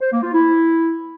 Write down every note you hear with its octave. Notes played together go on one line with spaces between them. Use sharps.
C5
A#3
F4
E4